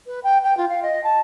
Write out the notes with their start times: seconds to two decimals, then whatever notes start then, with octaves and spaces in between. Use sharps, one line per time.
0.06 B4
0.24 G5
0.44 G5
0.57 F4
0.69 F5
0.83 D#5
1.04 A5